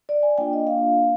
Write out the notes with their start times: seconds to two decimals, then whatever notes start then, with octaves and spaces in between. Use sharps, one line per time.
0.09 D5
0.23 G#5
0.38 A#3 D4 F4 G5
0.53 D#5
0.67 F5